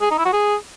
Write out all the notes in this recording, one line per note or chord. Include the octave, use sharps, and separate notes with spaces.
G#4
D#4
E4
F#4
G#4